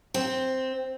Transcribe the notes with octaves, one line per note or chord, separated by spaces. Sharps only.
C4